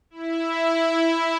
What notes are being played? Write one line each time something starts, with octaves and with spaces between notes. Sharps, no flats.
E4